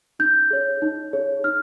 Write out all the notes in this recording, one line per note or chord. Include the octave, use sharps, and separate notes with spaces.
D#4 G6
G#4 C#5
D#4
G#4 C#5
D#4 F6